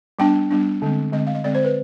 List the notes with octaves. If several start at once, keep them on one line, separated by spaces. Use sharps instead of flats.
G3 B3 D4 G5
G3 B3 D4
D3 G#3 C4
D3 G#3 C4 D#5
F5
D#5
D3 G#3 C4 D5
C5
B4